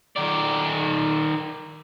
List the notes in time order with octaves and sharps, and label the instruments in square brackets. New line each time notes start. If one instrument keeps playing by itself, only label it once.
[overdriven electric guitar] D#3 D5